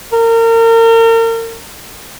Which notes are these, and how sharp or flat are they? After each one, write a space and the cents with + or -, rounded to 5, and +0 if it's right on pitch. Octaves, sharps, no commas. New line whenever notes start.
A#4 -35